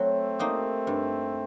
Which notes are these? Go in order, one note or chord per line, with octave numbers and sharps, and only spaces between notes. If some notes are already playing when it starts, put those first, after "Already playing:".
Already playing: F#3 A3 C4
A#3 D#4 G4
G2